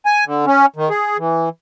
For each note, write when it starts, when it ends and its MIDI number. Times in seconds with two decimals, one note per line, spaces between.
0.06 0.24 80
0.26 0.45 50
0.46 0.66 61
0.76 0.89 51
0.90 1.17 68
1.18 1.49 52